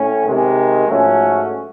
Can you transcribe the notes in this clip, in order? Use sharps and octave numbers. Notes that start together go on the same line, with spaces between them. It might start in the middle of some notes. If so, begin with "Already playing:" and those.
Already playing: A2 C#4
C3 D#3 G#3
G#2 F3 A3 C#4 F#4